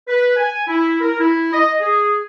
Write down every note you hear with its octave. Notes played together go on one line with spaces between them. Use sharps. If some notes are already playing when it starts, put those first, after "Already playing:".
B4
G#5
E4
A#4
E4
D#5
G#4